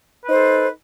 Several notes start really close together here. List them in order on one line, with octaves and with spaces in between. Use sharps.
B4 D#4 C5 A4